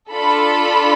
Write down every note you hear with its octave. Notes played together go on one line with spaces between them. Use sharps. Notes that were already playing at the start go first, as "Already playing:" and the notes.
D4 F4 A4 B5